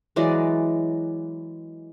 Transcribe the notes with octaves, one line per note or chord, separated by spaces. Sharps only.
E3 F#3 G#3 D5